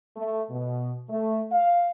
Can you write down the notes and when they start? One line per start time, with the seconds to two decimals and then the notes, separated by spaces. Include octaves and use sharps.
0.16 A3
0.51 B2
1.10 A3
1.52 F5